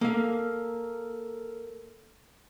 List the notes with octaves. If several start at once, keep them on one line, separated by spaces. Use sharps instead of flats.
A#3 A4 A#4 F5